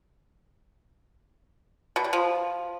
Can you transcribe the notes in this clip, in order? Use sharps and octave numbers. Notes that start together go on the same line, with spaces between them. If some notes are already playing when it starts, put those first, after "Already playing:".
B2
G3
F3